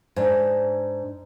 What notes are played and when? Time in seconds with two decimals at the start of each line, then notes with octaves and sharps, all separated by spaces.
0.16 G#2 D4